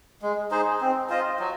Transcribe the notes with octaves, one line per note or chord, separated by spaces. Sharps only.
G#3
D#4 G#4 C5
C4
F4 C5 D#5
F#3